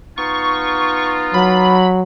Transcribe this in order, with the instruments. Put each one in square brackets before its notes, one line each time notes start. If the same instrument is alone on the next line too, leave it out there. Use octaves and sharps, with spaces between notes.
[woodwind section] B3 D#4 F4 [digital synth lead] C#6
[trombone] F#3 [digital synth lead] B5